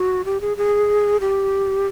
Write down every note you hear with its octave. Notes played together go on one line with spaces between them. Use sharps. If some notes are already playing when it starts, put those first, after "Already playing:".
Already playing: F#4
G4
G#4
G#4
G4